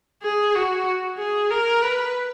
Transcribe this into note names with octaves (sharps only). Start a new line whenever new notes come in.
G#4
F#4
G#4
A#4
B4